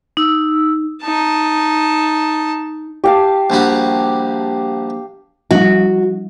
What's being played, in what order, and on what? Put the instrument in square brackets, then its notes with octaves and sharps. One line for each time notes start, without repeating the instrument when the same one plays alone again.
[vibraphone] D#4 E6
[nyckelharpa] D#4 A5
[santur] G4 F5 A5
[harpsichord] A#1 G3 F#4
[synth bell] F3 G3 [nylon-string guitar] F#4